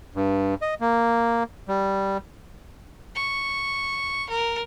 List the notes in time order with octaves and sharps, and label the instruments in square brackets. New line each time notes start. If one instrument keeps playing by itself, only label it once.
[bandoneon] G2
D#5
A#3
G3
[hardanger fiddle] C#6
A#4